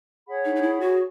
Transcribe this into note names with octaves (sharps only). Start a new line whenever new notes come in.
G#4 C#5 F#5 B5
D#4
D#4
E4
F#4